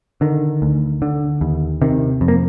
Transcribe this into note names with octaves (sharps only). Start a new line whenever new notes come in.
D3 D#3
D2
D3
D#2
C3 D#3
F2
A#3